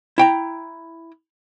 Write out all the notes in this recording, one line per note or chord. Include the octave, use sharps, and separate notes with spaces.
E4 G5 A#5